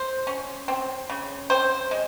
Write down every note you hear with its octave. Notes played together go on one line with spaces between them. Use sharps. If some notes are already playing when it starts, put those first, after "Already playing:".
Already playing: C5
C#4
C4
C#3
C4 C5
G#3